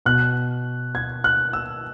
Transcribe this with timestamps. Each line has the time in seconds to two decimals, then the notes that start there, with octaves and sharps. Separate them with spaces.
0.06 B2 F#6
0.95 G#6
1.24 F#6
1.53 E6